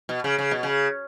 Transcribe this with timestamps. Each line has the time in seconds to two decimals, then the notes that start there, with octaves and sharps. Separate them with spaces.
0.09 B2
0.24 C#3
0.39 C#3
0.51 B2
0.63 C#3